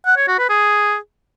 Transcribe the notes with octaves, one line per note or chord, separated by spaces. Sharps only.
F#5
C#5
F#4
B4
G#4